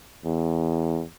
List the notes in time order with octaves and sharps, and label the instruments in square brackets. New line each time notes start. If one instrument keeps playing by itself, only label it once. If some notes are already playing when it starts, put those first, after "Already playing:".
[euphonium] E2